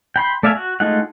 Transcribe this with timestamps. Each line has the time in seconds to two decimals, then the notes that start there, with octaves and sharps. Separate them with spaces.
0.16 G5 B5 C6
0.43 A3 D5 E5 F5 G#5
0.56 F#4
0.80 G#3 A3 D#4 F4 F#5